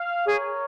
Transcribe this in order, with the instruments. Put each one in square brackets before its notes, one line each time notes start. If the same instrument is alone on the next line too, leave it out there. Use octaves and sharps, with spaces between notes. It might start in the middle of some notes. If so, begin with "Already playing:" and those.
Already playing: [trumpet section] F5
[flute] G#4 [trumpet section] A#4 C#5